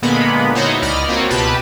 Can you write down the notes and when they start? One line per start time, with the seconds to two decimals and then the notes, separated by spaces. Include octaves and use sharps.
0.02 A#2 D3 G#3 A#3 B3 B5
0.55 D#4 E4 F#4 C5 C#5 D#5
0.82 C#2 D5 D#5 B5 F6
1.09 A#3 C4 F4 F#4 C#5
1.30 C#2 B2 G4 B4 A5 B5